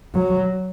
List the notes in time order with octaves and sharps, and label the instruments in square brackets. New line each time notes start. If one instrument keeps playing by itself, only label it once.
[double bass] F#3